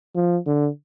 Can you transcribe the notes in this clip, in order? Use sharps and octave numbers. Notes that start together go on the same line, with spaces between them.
F3
D3